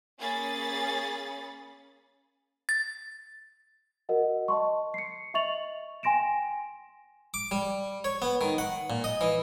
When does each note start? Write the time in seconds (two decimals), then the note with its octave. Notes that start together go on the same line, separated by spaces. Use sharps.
0.19 A#3 C#4 G#4 C#5 B5 A6
2.69 A6
4.09 F#4 A#4 D#5 F#5
4.48 D#5 A5 C6 C#6
4.94 C7 C#7
5.34 D#5 E5 C#6 A6 F7 F#7
6.03 G5 G#5 C6 A#6 D7 E7
7.34 D6
7.51 G3
8.04 C#5
8.22 B3
8.41 D#3
8.58 F#5
8.90 A#2
9.04 D#5
9.21 E3